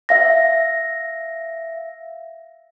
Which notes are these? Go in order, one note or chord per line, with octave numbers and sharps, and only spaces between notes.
E5 F5 A#6